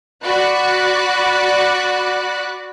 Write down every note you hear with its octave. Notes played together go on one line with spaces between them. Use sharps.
F#4 D5 B5 F#6